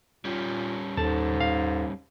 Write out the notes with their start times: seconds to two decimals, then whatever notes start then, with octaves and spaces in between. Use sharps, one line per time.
0.25 A#2 G3 C#4
0.97 D#2 G#2 A4 A5
1.40 F5